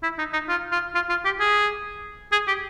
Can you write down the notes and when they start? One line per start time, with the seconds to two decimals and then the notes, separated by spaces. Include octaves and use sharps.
0.03 E4
0.18 D#4
0.33 D#4
0.48 F4
0.71 F4
0.95 F4
1.09 F4
1.25 G4
1.40 G#4
2.32 G#4
2.47 G4